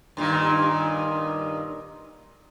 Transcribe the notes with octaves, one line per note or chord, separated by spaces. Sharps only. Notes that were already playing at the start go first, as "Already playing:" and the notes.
G2 A#2 D#3